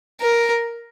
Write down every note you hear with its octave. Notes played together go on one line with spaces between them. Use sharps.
A#4